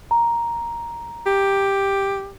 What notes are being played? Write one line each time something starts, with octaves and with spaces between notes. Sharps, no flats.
A#5
G4